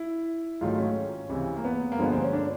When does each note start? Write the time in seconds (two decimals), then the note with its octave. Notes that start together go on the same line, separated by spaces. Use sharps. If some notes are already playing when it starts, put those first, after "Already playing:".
Already playing: E4
0.61 G#2 D#3 F#3 A3 F4
0.78 C#4
1.29 C#2 C3 E3
1.57 A#3
1.65 B3
1.92 A#3
1.98 G2 D3 F3 G#3 B3
2.12 C4
2.23 C#4
2.33 D4